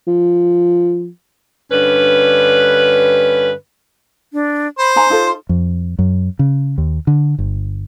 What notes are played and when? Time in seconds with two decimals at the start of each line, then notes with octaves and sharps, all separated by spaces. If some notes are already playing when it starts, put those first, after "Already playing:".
0.07 F3
1.71 G2 D3 C#4 B4
4.33 D4
4.79 C5 B5
4.96 D#4 G#5 A#5 C6
5.10 D#4 F4 A4
5.49 F2
5.99 F#2
6.39 C#3
6.78 D#2
7.07 D3
7.39 G1